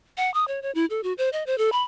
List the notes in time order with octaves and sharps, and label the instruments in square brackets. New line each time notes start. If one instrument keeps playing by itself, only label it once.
[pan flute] F#5
D#6
C#5
C#5
E4
A4
F#4
C5
D#5
C5
A4
B5